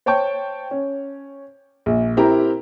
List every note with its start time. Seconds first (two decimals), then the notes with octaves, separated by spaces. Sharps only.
0.06 C5 C#5 G5 A5 C#6 G6
0.71 C#4
1.86 A#1
2.17 C4 E4 G4 A#4 A#5